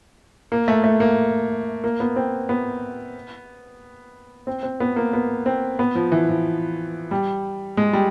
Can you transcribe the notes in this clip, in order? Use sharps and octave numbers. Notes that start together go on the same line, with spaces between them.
A#3
A3
A3
A#3
A#3
B3
C4
B3
C4
C4
B3
A#3
B3
C4
B3
F3
E3
F3
G3
G#3
G3